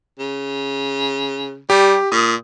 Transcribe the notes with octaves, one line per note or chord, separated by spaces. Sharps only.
C#3
G3 G4
A#2 D#6